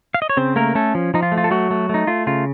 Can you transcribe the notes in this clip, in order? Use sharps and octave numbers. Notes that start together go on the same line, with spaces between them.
F5
D#5
C#5
C#3 C4 C5
A3 A#3 A#4
A3 C#4 A4
F3
F3 D#4
F4
A3
F4
A4
F#3 A3 F#4
A3
A3 D#4
A3 F4
C#3 F4